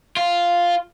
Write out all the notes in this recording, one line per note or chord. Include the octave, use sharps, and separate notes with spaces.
F4